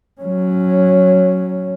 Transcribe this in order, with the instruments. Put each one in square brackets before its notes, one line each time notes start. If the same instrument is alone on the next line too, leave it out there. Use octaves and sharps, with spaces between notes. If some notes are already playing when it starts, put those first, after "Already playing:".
[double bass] F#3 C#4